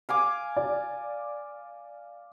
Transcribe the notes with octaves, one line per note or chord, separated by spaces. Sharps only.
F5 G#5 D6
D5